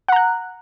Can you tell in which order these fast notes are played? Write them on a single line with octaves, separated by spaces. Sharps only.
F#5 A#5 F#6